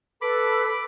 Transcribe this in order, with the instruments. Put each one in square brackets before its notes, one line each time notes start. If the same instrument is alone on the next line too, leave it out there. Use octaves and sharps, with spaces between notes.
[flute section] A4 B4 [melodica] B5 D6